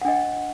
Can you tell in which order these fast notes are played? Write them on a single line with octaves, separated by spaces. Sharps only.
F#5 D4 D#5